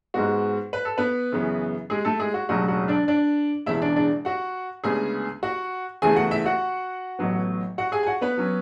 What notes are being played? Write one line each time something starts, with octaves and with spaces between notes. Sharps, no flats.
G#2 G#3 B3 F#4
B4
A4
B3 B4
F#2 C#3 E3 B3
G#3 G#4
A3 A4
G#3 G#4
F#4
E1 D2 C#3 F#3 F#4
F#4
D4 D5
D4 D5
E1 E2 C#3 E3 E4 E5
D4 D5
D4 D5
F#4 F#5
D2 C#3 G#3 B3 G#4 G#5
F#4 F#5
E2 C#3 E3 A3 G#4 G#5
F#4 F#5
E4 E5
F#4 F#5
A1 A2 F#3 B3
F#4 F#5
G#4 G#5
G#5
F#4 F#5
B3 B4
F#3 C#4